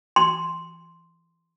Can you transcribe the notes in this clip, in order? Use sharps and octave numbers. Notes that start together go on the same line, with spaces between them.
C6